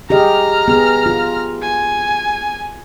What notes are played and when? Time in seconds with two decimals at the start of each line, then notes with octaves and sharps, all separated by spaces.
0.10 G4 G#4 D#5 A#5 F6
0.68 B3 G#4
1.06 F4
1.63 G#5